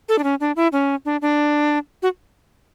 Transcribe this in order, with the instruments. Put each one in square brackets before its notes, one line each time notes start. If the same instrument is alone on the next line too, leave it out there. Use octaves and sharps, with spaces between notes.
[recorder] A4
D4
C#4
D4
E4
C#4
D4
D4
F#4